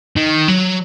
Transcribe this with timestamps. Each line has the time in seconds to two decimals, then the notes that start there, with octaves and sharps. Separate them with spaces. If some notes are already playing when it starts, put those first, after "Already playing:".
0.16 D#3
0.48 F#3